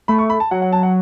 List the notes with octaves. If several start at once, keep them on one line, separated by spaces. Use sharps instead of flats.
A3 B5
C#6
B5
A5
F#3 F#5
F#5
A5
F#5